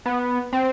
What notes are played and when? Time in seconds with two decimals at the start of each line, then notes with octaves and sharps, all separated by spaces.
0.06 B3
0.53 C4